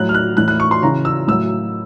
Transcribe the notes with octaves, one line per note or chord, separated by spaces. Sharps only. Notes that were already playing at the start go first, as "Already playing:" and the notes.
Already playing: A2 F#3 F#6
F6
F#6
A2 E3 F#6
F#6
C#6
C6
C#3 E3 A#5
E6
A2 F#3 E6